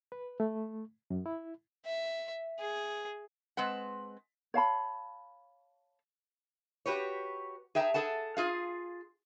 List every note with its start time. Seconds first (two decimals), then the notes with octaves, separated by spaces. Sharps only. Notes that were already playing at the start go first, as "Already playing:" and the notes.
0.12 B4
0.40 A3
1.10 F#2
1.26 E4
1.85 E5
2.59 G#4
3.57 G#3 C4 B4 F#5
4.54 C#5 F5 A5 B5
6.86 F#4 G4 B4 C#5
7.75 G#4 E5 G5 A5 A#5
7.94 G#4 A4 F#5 A5
8.37 F4 G#4 F5